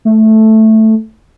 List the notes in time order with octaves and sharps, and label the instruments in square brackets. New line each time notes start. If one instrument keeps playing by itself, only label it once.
[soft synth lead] A3